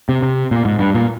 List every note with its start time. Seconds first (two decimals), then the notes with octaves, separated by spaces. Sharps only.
0.09 C3
0.22 C3
0.51 A#2
0.65 G#2
0.79 G2
0.94 A#2